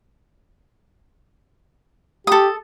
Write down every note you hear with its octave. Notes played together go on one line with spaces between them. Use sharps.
G4 A4 D#6